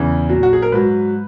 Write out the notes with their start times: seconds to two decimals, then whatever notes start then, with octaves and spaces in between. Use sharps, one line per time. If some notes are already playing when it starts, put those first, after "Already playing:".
Already playing: E2 C#3 E3
0.30 A#2 F#3
0.43 F#4
0.53 G#4
0.62 A#4
0.72 G#2 F#3 B4